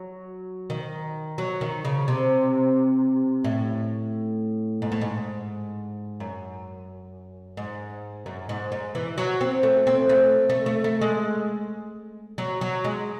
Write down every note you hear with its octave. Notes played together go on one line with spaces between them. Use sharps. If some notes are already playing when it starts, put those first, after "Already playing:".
Already playing: F#3
D#3
F#3
D#3
C#3
C3
A2
G#2
A2
G#2
F#2
G#2
F#2
G#2
G#2
E3
F#3
C4
A3
C4
A3
A3
A3
A3
G#3
F#3
F#3
G#3